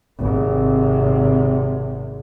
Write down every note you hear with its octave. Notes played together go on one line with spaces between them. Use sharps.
G#1 C3